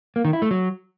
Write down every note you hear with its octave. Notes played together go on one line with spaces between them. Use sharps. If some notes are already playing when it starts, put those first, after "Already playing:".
A#3
D#3
E4
A3
F#3